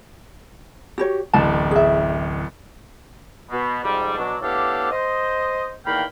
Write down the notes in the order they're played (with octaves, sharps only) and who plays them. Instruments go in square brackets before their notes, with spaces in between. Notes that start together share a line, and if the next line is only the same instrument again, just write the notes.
[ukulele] F#4 G4 C#5
[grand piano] D1 A1 [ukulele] A5
[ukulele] G#4 E5
[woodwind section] B2
F2 G#2 C3 G3
B2 F#3 D4
A2 B3 D4 G4 A4 F5
C5 D#5
E2 D#3 A#3 F5 G5 B5